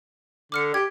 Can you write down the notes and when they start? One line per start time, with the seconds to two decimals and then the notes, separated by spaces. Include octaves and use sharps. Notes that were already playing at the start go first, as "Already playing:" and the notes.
0.52 D3 D6 F6 C#7
0.74 G4 G#6